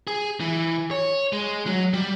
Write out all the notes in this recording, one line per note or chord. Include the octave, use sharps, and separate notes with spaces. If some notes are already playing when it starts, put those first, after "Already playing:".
G#4
E3
C#5
G#3
F#3
G3